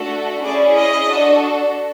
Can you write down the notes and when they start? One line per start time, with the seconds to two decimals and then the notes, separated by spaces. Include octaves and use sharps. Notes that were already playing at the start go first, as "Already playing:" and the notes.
Already playing: A3 D4 F#4 A4
0.43 C#4 E4 G#4 D5
0.76 D#5
1.07 D4 F#4 A4